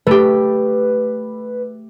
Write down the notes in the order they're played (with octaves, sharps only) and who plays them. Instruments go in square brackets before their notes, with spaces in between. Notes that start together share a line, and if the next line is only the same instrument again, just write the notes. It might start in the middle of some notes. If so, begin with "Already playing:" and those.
[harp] A3 G4 [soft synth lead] B4